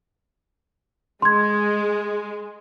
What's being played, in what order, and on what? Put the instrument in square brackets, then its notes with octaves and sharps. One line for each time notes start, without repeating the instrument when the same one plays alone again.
[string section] G#3 [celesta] C6 G#6